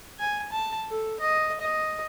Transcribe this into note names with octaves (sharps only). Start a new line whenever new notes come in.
G#5
A5
A4
D#5
D#5